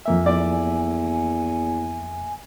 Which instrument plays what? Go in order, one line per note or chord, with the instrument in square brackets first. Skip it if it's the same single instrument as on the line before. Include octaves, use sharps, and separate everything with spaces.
[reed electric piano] F2 A#3 E5 [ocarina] G#5
[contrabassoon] E2 [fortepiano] D5